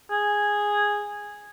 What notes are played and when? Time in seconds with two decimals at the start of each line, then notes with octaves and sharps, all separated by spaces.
0.11 G#4